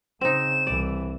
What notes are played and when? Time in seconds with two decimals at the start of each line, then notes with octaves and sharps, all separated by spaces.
0.21 C#3 C4 D#4 E7
0.67 C2 E3 D5